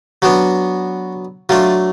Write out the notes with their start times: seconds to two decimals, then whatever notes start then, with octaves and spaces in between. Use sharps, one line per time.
0.22 F#3 B3 D4 F#4
1.49 F#3 A3 D4 F4